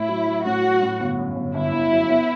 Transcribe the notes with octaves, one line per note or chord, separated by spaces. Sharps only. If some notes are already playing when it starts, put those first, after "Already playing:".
Already playing: A2 E4
F#3
F#3
A2 F#4
F#3
A2
G1
F#2
G1
G1 E4
G1
F#2
B3